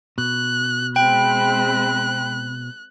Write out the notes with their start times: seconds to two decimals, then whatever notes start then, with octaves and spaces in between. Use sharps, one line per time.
0.18 B2 F#6
0.96 G#3 C4 G5 B5 F#6